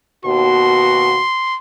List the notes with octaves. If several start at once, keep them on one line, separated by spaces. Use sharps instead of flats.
D#2 B2 F#4 C6